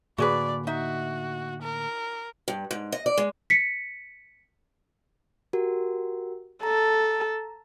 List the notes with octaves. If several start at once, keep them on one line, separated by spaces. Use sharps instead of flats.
A2 D3 A#3 F#4 G#4 B4 D5
D#4 F#4 E5
A#4
G2
G#2
D#5
D5
G#3
B6 C#7
F#4 G4 A#4
A4 A#5